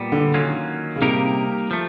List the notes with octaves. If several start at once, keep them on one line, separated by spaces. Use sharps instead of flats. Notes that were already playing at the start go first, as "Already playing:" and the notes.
Already playing: A#2 G3 B3
D3
D#3 F#3 A#3 C#4 F4
C#3
C3 G3 A#3 D#4 G4 A#4
F3 A3